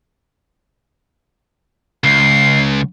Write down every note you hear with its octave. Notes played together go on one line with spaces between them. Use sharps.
C#2 C7